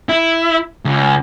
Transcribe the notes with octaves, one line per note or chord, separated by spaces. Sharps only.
E4
C#2